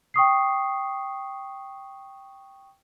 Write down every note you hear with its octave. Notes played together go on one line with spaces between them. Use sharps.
G5 C#6 D#6 C7